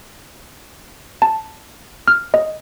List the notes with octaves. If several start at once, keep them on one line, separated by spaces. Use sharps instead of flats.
A5
F6
D#5